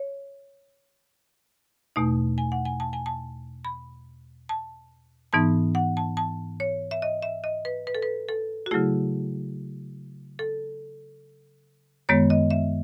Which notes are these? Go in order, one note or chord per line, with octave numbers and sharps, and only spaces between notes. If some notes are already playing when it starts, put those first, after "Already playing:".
Already playing: C#5
E2 B2 A3 D#4
G#5
F#5
G#5
A5
G#5
A5
B5
A5
G#2 E3 B3 D#4 A5
F#5
A5
A5
C#5
E5
D#5
E5
D#5
B4
B4
A4
B4
A4
F#4
C#3 F#3 A3 E4 G#4
A4
F#2 D#3 G#3 B3 C#5
D#5
E5